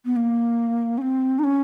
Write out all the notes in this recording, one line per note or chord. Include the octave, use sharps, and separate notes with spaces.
B3
A#3
C#4
C4
D#4
C#4